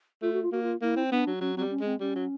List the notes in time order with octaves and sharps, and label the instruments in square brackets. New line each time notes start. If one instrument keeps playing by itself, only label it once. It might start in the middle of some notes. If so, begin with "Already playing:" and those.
[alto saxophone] A3 [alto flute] F4
[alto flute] F#4
F4
[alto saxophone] A#3 [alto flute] F#4
[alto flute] F4
[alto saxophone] A#3 [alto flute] E4
[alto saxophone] C4
[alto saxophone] B3 [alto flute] D4
[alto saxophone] F#3
[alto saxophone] F#3 [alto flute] C#4
[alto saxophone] F#3 [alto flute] C4
[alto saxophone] G3
[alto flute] C#4
[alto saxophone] G#3 [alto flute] C4
[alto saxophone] G3 [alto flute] C#4
[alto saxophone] F#3